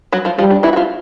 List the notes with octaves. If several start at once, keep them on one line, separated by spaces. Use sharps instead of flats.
F#3 F#4
F3 F4
F3 G3 F4
D4
E3 E4
F#4
F3 F4